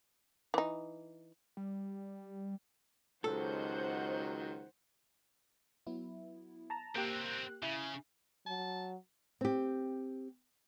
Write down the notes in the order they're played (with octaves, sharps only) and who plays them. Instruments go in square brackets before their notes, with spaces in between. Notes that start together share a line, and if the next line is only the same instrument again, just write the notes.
[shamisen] E3 D#4
[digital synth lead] G3
[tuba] C#2 [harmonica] D#3 F#3 [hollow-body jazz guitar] A4 [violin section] C5 F#5 G6
[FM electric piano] F#3 B3 E4
A5 A#5
[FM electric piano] A#3 G4 F#6 [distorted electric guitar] C4 A#4
[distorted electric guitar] C#3 [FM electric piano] E4
[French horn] F#3 [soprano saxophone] A5
[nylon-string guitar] C4 G4